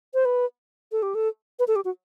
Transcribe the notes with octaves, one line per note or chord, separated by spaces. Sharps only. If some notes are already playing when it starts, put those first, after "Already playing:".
C5
B4
A4
G4
A4
B4
A4
G4
F#4